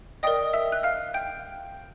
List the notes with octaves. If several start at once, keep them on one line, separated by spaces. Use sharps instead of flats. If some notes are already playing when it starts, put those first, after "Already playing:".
A#4 D5 D#5 G5 D#6
E5 E6
F#6
F5 F6
G5 G6